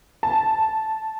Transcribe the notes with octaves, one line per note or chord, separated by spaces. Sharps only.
A5